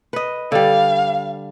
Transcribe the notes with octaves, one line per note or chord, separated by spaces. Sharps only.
B4 D#5
D3 G3 F5